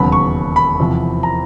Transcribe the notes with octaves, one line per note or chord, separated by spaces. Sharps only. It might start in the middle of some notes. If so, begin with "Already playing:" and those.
Already playing: E1 D#2 C#3 F#3 B3 B5
C#6
B5
E2 C3 F3
A#5